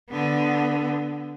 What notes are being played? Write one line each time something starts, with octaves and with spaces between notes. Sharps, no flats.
D3 B3